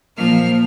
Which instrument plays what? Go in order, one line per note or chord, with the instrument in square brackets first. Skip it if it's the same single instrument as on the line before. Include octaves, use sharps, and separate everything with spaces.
[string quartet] A#2 F3 A#3 F6